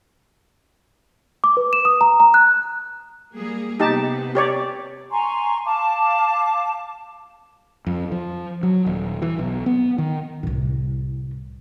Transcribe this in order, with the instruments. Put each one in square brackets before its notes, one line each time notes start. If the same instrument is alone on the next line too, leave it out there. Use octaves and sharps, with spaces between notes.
[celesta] D6
B4
E7
D#6
A#5
A#5
F#6
[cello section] G3 A#3 G#4
[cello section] C3 B3 [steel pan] D#4 G4 A5
[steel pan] G4 C#5 D5
[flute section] G#5 A#5 C6 C#6
F5 A5 D6
[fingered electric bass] F2
F3
F#3
D#1
E3
B1
B3
D#3
[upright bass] C2 A2